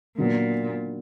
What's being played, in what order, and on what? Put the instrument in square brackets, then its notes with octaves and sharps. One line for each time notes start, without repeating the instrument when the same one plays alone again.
[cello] A#2 [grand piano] D#3 F#3 B3 D4